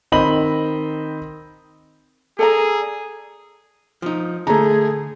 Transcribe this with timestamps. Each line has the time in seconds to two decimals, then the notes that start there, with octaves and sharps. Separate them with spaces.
0.12 D#3 C4 D#5 B5 F#7
2.39 G#4 A4 D5 A#5
4.02 F3 D#4
4.47 D3 A3 G#4 A#5